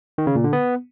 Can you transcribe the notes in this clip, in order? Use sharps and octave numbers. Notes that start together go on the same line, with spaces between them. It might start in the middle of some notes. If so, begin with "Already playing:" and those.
D#3
C#3
A#2
D3
B3